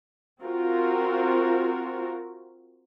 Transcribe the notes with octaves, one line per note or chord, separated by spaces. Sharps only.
C4 F4 F#4 A#4